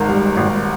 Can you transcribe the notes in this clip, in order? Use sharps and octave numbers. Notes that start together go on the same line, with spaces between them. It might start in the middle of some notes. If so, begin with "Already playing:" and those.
Already playing: G#1 G#2 A#4
G3
G#1